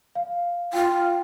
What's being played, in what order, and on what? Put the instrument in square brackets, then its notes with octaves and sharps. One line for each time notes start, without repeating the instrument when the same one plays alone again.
[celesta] F5
[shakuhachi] F4 [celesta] G5